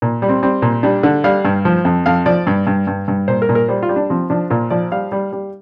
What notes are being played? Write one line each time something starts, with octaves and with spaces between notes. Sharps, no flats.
A#2
G3
C4
G3 C4
A#2
G3 D4
D3
G3 F5
G2
F3
F2
F2 F5
F3 D5
G2
G2
G2
G2
A#2 C5
A#4
A#2
A#4
G3 C5
F4
G3
D4
F3 C4
F3 D4
A#2 F4
F3 D5
G3 F5
G3
G3